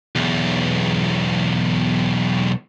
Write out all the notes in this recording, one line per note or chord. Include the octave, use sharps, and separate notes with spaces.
B1 E2